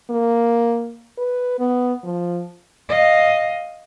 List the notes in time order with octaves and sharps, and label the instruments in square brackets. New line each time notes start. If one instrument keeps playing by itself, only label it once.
[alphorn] A#3
B4
B3
F3
[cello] D#5 F5